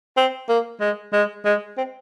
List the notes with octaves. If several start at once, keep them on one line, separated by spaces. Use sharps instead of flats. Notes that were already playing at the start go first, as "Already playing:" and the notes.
C4
A#3
G#3
G#3
G#3
C4